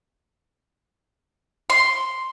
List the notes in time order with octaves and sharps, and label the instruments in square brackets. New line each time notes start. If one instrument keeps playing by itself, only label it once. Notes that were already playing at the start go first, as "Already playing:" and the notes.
[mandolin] C6